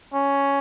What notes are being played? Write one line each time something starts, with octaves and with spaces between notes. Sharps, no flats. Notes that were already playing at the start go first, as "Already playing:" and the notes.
C#4